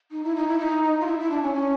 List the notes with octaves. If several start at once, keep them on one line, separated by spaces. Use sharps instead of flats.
D#4
E4
D#4
E4
D#4
D#4
F4
E4
E4
D4
C#4
C#4